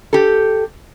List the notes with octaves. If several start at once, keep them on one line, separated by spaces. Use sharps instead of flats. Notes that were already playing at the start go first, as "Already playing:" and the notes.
G4 A4